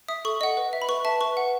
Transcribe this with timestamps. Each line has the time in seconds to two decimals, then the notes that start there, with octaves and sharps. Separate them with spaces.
0.08 E5 D#6
0.25 A4 C#6
0.41 D#5 F#5
0.57 B4
0.73 E5
0.82 B5
0.89 B4 C#6
1.05 E5 A5
1.21 B4 C#6
1.37 F#5